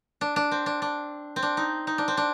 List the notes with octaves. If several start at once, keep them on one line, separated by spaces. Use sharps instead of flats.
D4
D4
C4
D4
D4
C4
D4
D#4
D#4
D4
C4
D4